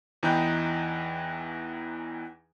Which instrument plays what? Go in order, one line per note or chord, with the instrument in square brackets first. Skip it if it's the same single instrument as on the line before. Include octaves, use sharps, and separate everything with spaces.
[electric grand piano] E2 E3 D#4 B4 G5 G6